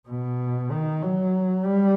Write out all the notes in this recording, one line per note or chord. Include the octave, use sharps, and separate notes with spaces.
B2
D#3
F#3
G3